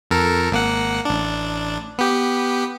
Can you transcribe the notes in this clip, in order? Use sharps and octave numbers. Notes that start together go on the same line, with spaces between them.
F2 A4 A#4
G#1 A#3 F#5
A1 D4
B3 G4